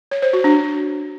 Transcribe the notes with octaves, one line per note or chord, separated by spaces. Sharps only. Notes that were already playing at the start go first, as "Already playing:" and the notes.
C#5
C5
F#4
D4